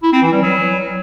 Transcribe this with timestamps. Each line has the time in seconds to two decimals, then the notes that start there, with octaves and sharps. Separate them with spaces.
0.03 E4
0.13 C4
0.23 E3
0.32 G3
0.42 F#3